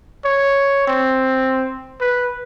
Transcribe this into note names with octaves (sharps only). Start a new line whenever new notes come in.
C#5
C4
B4